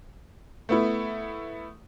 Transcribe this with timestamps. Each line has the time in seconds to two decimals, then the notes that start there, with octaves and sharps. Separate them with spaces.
0.69 A3 B3 E4